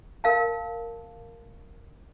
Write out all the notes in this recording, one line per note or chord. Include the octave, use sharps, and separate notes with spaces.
A#4 F5 A5